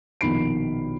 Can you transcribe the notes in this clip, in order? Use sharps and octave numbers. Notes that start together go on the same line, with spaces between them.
A#1 B2 D#3 B5 C7 D7